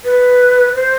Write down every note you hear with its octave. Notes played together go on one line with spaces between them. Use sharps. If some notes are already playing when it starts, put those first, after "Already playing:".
B4
C5